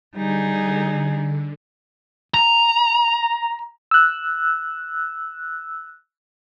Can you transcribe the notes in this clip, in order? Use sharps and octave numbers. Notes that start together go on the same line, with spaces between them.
D3 G3 D#4 G#4
A#5
E6 F#6